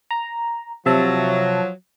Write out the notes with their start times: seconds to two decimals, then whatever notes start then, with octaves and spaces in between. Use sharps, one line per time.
0.11 A#5
0.86 C3 F3 F#3 E5 A5